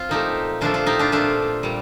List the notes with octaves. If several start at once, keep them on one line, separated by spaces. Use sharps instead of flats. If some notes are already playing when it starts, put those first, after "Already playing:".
Already playing: C4 F4
A#2 F3 A3 D#4 G4
A#2 F3 A3 D4 F4
D4 F4
D#4 G4
D4 F4
A#2 F3 A3 D4 F4
A#2 G3